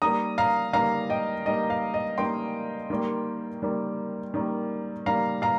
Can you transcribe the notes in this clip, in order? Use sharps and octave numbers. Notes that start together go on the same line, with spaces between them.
D#3 G3 A#3 A#5 D#6
F5 A#5
D#3 G3 A#3 F5 A#5
D#5 G5
D#3 G3 A#3 D#5
F5
D#5
D#3 G3 A#3 G5 C6
D#3 G3 A#3
D#3 G3 A#3
D#3 G3 A#3
D#3 G3 A#3 F5 A#5
F5 A#5